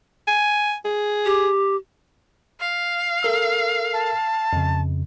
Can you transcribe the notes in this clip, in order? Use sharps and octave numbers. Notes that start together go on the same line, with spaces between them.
G#5
G#4
G4
F5
A4 A#4 E6
A5
F2 C#3